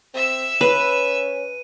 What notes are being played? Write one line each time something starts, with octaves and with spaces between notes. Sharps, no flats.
C4 E5 E6
C#4 B4 D#7